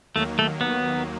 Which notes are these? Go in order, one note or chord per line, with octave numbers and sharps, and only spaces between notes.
D#2 D#3 F#3 A3 A#3
A3
B3